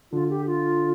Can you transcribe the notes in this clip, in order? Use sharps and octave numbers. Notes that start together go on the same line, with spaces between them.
D3 F4
G4
F4